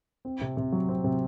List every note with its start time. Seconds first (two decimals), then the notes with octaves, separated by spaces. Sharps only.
0.25 C4
0.41 C3
0.57 C3
0.72 F#3
0.89 C4
1.04 C3